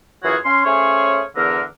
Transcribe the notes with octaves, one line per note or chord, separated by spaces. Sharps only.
F#2 E3 F4 F#4 G#4 C#5
C#4 C6
A3 C#4 G#4 C5 C#5 F5
E2 D3 A#4